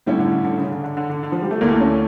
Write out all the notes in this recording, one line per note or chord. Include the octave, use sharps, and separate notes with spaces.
A2 D3 G3 C#4 E4
D3
D3
D3
C#3
D3
D3
D3
D3
D3
F3
G3
A3
D2 D3 A3 A#3 E4
C#4